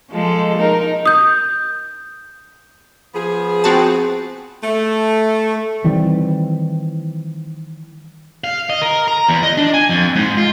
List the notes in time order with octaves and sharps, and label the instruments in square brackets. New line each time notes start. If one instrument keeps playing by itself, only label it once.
[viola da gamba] F3 G#3 A4
D#4 A#4
[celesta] D#6 G6
[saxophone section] F3 B3 G#4
[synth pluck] C4 F#4 A5
[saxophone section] A3
[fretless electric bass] D#3 E3 G3 C4
[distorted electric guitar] F5
D#5
A#4
A#5
E2
D#5
D4
G#5
F2
G#2
F4